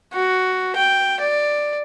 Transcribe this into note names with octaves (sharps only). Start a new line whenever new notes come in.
F#4
G5
D5